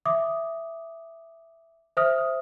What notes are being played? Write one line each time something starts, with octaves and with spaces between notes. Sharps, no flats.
E5 D6 D#6
C5 E5 D#6 F6